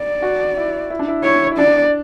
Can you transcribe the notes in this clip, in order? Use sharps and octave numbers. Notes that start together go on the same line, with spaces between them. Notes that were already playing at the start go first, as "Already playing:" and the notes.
Already playing: D5
F#4
E4
E4
D4
E4
E4 C#5
E4
D4 D5